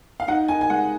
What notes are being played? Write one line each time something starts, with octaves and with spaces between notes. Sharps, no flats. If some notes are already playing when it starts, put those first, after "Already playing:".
F5
D#4 F#5
D#4 G#5
G#5
G#3 F#5